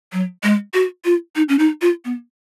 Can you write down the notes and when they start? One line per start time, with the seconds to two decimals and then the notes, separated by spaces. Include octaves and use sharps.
0.13 F#3
0.43 G#3
0.74 F#4
1.05 F4
1.36 D#4
1.49 C#4
1.59 D#4
1.82 F4
2.05 B3